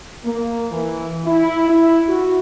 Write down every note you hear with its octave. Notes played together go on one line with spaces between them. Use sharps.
A#3
E3
E4
E4
F#4